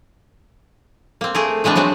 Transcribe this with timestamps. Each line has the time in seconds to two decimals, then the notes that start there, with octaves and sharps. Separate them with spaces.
1.21 A#3 C4
1.35 A3 G#4 A#4
1.64 E3 G#3 B3 C4 D4
1.76 F#3 G#3 C4 F#4